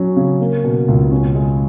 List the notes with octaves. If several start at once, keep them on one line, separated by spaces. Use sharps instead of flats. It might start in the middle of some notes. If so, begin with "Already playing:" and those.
Already playing: F#3 C#4
C#3
A#3
B2
C#2
C#4
G#3